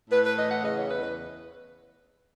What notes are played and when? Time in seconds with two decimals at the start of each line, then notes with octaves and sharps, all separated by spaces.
0.10 A2 B4
0.24 B4
0.36 E3 D#5
0.49 F#5
0.62 C#3 D#5
0.75 C#5
0.88 E2 B4
1.01 B4